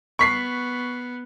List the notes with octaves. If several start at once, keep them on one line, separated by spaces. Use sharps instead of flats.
B3 C#6 B6 C7